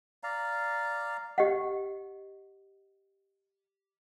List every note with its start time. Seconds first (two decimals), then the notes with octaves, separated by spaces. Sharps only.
0.23 D5 F5 A#5
1.38 G4 D#5 F#5